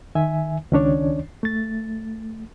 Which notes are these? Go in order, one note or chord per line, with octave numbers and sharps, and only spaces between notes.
D#3 E5 G#5
C#2 D#3 C#4 D4 C#5 D5
A3 A6